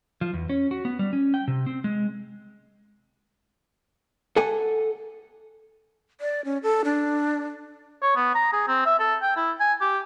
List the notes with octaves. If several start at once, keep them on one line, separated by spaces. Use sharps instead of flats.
F3
E2
C#4
F#4
B3
G3
C#4
G5
C3
C4
G#3
A4 F#5 G#5
D5
C#4
A4
D4
C#5
B3
A#5
G#4
C4
E5
A4
G5
E4
G#5
G4